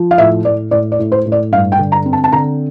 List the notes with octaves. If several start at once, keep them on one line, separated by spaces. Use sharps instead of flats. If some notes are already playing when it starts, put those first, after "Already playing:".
Already playing: F3
F5
A2 E5
A2 D5
A2 D5
D5
A2
C5
A2
D5
G2 F5
G5
D3
A#5
C4
A5
A5
D3 A#5